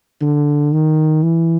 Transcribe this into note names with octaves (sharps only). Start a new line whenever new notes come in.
D3
D#3
E3